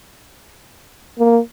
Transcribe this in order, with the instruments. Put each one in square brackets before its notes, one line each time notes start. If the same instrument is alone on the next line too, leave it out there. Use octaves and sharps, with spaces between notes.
[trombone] A#3